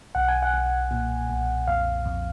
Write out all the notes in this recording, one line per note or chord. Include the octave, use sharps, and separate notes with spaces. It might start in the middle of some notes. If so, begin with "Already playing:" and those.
B1 F#5
G#5
F#5
B1
A#2
B1
F2 F5
F2